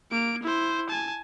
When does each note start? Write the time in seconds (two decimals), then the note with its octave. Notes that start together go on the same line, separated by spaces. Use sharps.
0.11 A#3 D7
0.42 E4 C5
0.89 G#5 A5